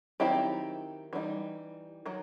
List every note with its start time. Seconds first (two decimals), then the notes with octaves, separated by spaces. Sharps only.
0.20 D#3 F#3 C4 D#4 E4 G4
1.13 E3 G3 D#4
2.06 D#3 F#3